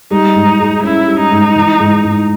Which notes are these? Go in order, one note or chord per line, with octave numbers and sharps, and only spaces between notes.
G3 D#4
G#2
G#4
C#4 E4
G3
D#4
G#2
E3
G#2
G#2